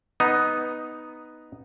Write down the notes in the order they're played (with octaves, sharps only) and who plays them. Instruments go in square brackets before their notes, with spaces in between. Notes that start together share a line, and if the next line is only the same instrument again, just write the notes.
[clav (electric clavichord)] B3 D#4